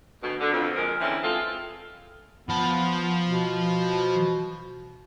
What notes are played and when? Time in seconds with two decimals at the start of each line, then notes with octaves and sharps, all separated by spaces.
0.22 D2 B2
0.40 D3
0.53 F2
0.76 A#2 F3 G#3 A#4
1.01 D3 E3 C4 C#4 E4
1.22 G#3 C4 F4 A4
2.49 F3 B3 A5
3.28 B2